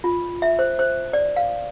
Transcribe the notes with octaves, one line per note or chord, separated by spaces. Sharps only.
F4
E5
C5
C5
D5
F5